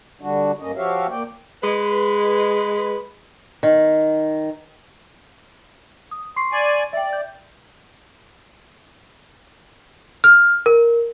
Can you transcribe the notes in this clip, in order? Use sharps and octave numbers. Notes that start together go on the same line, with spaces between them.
D3 G3 D4 F#4
G2 A#3 C#4 D#5
F3 F#4 G4 C#5 E5 F5
A#3 D5 G5
G#3 B4
D#3
D#6
C6 C#6 C7
D5 G#5
D5 E5 G5
G6
F6
A#4